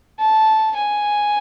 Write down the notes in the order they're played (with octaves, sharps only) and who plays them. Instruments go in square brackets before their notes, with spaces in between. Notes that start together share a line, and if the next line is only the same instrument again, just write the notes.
[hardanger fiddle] A5
G#5